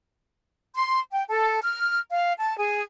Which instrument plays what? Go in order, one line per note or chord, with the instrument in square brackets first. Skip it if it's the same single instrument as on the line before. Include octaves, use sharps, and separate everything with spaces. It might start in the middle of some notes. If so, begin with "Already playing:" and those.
[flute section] C6
G5
A4
F6
F5
A5
G#4